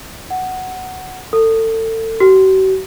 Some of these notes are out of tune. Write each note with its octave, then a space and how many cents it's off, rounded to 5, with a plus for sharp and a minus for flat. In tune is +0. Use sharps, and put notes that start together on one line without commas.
F#5 +5
A4 +30
F#4 +45